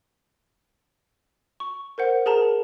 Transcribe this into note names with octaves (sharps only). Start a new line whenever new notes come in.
C#6
A#4 C5 F#5
G#4 A#4 A5 A#5